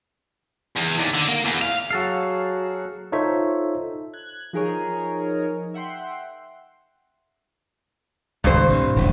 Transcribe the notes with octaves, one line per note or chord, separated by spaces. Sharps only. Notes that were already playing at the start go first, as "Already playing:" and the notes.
E2
D#2
D3
A#3
E2
F5
F#3 F#4 G#4 A4 F5
D#4 F4 A4 C5 C#5 E5
F#6 G#6
F3 D#4 G#4 A#4 C#5
E5 F#5 G5 C6
G#1 C#2 G2 C5
A2 C3
D#1 A1 F#2